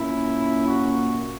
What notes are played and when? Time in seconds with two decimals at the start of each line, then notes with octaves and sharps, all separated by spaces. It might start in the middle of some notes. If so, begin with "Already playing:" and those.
Already playing: A#2 A#3 C#4 E4
0.67 F#4